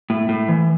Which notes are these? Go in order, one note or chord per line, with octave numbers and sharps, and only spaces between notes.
A2
A2
E3